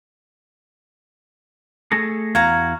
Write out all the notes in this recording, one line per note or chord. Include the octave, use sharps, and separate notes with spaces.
A3 G#4 A4 A#6
E2 F#4 F5 A#5 G#6